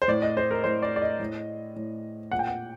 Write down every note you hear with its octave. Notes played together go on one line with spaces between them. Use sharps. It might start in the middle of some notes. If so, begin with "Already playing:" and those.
C5
A2 D5
D#5
C5
A#4
A2 C5
D5
D5
D#5
A2
A2
A#2 F#5
G5
F#5